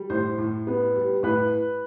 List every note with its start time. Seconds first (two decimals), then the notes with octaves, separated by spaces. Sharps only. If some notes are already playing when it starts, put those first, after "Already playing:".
Already playing: G3
0.10 A2 C5
0.38 A2
0.67 B3
0.95 G3
1.23 A2 B4